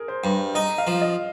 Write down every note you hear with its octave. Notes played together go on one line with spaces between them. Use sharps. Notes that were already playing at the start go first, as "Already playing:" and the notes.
Already playing: G#4 A#4
C5
G2
D#4 D#5
F5
F3
D#5